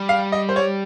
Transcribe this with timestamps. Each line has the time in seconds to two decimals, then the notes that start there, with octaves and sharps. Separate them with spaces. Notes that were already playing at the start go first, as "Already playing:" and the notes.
Already playing: G3
0.09 F5
0.32 D#5
0.49 C5
0.56 C#5